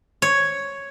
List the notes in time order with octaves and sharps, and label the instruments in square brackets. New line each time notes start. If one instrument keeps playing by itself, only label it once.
[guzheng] C#5